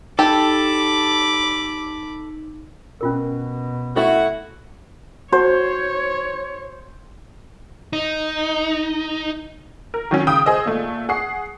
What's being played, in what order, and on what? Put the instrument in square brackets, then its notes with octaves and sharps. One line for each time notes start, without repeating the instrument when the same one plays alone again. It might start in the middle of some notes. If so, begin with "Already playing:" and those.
[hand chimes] D#4 [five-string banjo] G4 [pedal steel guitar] A4 [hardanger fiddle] B5 D6
[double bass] B2 [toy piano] C#4 F4 A#4
[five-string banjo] A3 E4 [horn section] F#4
[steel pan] F#4 [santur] C5 [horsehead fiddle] C#5
[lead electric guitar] D#4
[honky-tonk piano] A#4
D#3 F#3 C#4
C#3 G5 D#6
G#4 C5 D#5 E6
A#2 A3
G#4 F#5 C#6 C7